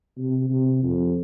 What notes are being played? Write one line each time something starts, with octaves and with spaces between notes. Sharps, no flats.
C3
C3
F2